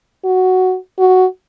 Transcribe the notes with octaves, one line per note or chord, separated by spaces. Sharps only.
F#4
F#4